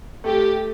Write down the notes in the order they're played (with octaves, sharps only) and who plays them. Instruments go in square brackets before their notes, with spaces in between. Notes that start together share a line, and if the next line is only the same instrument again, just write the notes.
[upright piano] A3 [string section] G4